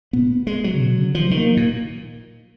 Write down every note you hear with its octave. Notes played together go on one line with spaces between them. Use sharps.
A#2 B3
G#3
F#3
C#3
B2
C#3
D#3 F3
F#3
D#3
A#3
A#2